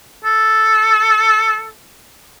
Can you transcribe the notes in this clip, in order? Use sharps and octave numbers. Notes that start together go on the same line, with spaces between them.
A4